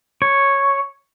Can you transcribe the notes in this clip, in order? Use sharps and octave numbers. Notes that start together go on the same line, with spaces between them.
C#5